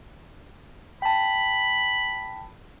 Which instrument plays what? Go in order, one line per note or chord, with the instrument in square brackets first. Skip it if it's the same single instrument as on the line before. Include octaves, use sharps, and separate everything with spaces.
[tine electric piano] G5 A5 [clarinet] B5